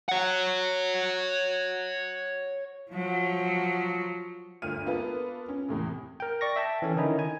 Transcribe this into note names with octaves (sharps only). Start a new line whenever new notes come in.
C#5 F#5
F3 F#3
G1 D2 A3 F4 F6 D#7
A#3 B3 F4 A4 B4
C#4
E2 A2 C3
A#4 G5
D5 C#6 A#6
E5 G5 A5
E3 C#4 A4
D3 D#3 C#4 D#4 E4
G#5